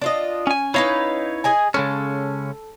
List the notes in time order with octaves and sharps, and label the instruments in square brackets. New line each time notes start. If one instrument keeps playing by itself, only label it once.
[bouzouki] D4 F4 D#5
[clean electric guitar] C#4 G#5
[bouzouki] C#4 D#4 B4 [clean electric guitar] E4 C#5 F5
[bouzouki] G#4 D#5 G#5
[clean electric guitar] C#3 G#3 C#4 [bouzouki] A4